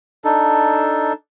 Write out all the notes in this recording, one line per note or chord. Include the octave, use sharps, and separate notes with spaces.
D4 D#4 A4